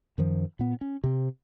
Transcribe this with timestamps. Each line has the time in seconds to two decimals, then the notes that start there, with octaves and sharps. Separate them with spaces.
0.18 F#2 D#3 F3
0.59 A#2 B3
0.81 C#4
1.04 C3 C4